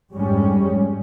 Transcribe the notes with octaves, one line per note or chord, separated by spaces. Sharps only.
G#1 F2 G3 G#3 C#4